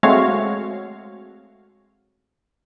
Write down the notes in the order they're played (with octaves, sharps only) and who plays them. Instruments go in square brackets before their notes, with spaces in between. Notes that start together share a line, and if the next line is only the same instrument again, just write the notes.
[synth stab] G#3 A3 C4 F#4 C#5 F5